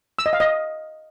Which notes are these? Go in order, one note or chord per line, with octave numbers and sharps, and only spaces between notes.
E6
D#5
F5
D#5